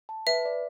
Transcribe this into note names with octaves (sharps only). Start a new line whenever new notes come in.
A5
B4 E5
D5